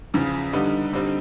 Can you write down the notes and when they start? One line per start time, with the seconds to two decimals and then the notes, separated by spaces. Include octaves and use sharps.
0.14 E2 C#3 F3
0.53 D3 G3 B3 D#4
0.93 D3 G3 C4 D#4